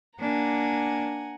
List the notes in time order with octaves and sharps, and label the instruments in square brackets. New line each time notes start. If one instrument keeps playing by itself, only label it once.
[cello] A#3 D4 [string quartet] F#5 G#5 A#5